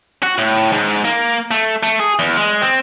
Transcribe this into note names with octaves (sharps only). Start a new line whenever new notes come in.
F#4
A2
G#2
A#3
A3
A3
G#4
E2
G#3
C4